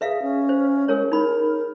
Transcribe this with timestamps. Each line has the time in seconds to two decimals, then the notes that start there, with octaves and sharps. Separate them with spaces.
0.01 G#4 B4 E5 F5
0.22 C#4
0.49 C5
0.88 G#3 G#4 A#4 C#5
1.12 D#4 A#4 B5